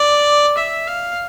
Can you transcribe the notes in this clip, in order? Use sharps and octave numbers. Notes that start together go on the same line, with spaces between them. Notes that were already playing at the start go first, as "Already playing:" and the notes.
Already playing: D5
E5
F5